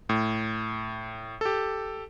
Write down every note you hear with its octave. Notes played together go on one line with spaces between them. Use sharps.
A2
G4 A4